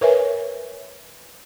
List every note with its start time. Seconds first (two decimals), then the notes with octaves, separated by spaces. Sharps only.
0.01 A#4 B4 C#5 E5 G#5